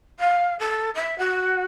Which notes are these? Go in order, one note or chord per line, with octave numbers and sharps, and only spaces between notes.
F5
A4
E5
F#4